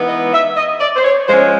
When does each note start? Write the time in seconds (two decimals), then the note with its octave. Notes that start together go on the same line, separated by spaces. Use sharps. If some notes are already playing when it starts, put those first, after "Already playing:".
Already playing: E3 G#3 B3 D#4
0.09 D#5
0.33 E5
0.56 D#5
0.79 D5
0.96 C5
1.04 C#5
1.27 F3 G#3 C#4 C5